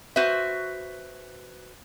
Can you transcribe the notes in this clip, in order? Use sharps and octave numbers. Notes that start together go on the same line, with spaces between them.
F#4 B4 C5 E5